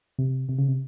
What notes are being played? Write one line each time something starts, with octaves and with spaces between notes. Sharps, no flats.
C3
C3
C#3
C3